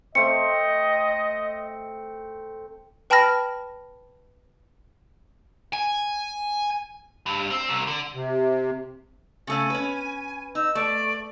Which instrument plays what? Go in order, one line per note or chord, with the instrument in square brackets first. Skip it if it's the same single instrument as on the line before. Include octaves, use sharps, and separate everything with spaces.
[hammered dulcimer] A3 C4 [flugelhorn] D#5 [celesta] C#7
[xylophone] B4 G5 A5 B5 F6 A#6
[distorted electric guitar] G#5
[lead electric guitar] G2
C4
C2
D3
[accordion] C3
[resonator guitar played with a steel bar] C#3 A3 C#4 [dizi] G#5
[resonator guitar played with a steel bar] C#4 B4
[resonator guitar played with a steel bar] D#4 [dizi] E6
[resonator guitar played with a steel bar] A3 [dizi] D5